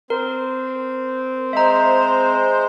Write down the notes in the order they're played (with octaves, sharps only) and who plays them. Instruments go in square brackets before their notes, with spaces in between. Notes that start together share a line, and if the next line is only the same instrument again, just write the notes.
[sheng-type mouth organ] C4 [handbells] A#4
[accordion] G#3 C5 [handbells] E5 A#5